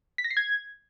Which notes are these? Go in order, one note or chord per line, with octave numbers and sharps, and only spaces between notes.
B6
A#6
C7
G#6